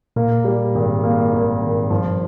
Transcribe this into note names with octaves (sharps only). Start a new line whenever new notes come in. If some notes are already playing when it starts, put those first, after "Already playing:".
A#2 A#3
G3
G#1
A#3
G#1
G#1
G2 F3